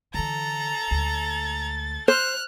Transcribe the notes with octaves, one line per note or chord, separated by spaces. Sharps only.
D3 E3 A4 A#5 A6
D2 G#3
C5 F6 F#6